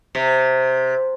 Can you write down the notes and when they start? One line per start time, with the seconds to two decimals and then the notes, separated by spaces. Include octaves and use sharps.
0.15 C3